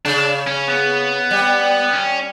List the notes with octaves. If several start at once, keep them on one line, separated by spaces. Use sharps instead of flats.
C#3 D4
C#4
B3
G3
C#4